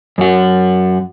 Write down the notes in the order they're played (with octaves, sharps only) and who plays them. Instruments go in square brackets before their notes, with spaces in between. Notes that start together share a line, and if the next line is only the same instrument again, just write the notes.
[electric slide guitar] F#2 F#4